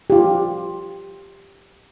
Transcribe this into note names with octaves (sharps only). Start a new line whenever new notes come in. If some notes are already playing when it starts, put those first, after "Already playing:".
F4 G4